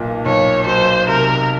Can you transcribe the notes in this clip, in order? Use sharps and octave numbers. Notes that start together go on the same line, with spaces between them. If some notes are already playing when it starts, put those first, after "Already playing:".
Already playing: B1 A#2
B1 C#5
F#3 C5
C3 A#4